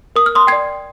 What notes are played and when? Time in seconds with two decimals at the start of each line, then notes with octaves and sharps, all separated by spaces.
0.16 A#4 D#6
0.26 F6
0.35 C6 D#6
0.47 D5 G5 G#6 C7